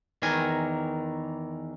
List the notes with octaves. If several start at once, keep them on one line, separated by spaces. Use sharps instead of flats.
E2 D#3 E3 A#4 G#5